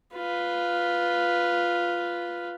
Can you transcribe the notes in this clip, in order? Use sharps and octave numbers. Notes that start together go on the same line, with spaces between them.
F4 B4